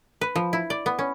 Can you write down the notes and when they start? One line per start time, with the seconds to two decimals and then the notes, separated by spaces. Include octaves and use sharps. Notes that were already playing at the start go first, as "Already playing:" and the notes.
0.21 B4
0.36 F3
0.53 E4
0.70 D5
0.86 B3
0.99 C#4